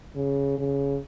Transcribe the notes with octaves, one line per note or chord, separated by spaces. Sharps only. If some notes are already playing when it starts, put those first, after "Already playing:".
C#3
C#3